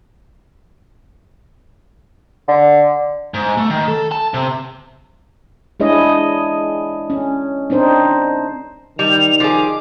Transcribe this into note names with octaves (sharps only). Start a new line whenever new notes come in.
D3
G#2
A3
D#3
A4
A5
C3
G#3 D4 E4 G#4 C#5 D#5
C#4
C4 D4 D#4 C5
D#3 G3 F7
F3 G#4 D6